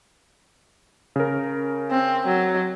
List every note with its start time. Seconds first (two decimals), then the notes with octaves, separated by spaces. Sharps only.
1.16 C#3 A#4
1.91 C4
2.27 F#3